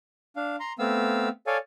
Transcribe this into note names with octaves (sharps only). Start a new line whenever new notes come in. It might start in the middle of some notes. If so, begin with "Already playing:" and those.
D4 F5
A#5 C6
A3 B3 C4 F5 E6
A4 C#5 D5 F5 G#5